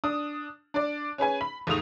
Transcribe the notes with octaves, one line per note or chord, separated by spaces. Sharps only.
D4 D#6
D4 D5
C#4 G#4 B4 G#5
B5
D#2 G#2 D#3 A3 D#6 F7